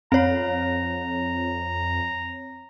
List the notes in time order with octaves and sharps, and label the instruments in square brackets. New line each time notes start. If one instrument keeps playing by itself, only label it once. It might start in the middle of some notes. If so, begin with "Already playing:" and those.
[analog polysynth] F2 [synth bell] C4 C#5 [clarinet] A#5